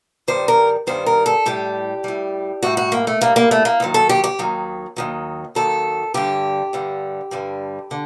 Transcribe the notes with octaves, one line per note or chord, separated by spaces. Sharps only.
G2 D#3 G3 C5
A#4
G2 D#3 G3 C5
A#4
A4
A2 G3 G4
A2 G3
A2 G3 F#4
F#4
A#3
A3
A2 G3 A#3
A#3
A3
A#3
D#2 D#3 F#3
A4
G4
G4
D#2 D#3 F#3
D#2 D#3 F#3
D#2 D#3 F#3 A4
G2 D3 G3 G4
G2 D3 G3
G2 D3 G3
D3